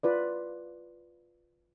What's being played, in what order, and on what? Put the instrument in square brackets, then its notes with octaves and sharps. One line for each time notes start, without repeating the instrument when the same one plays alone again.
[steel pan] F4 B4 D5